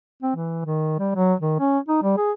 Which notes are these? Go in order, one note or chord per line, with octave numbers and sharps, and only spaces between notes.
C4
E3
D#3
G3
F#3
D#3
C#4
D#4
G3
G#4